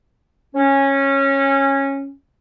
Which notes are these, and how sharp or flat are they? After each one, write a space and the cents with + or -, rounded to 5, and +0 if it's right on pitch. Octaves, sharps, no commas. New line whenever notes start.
C#4 -15